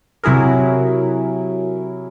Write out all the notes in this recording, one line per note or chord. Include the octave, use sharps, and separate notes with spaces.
C3 F#3 E4 G#4 A#4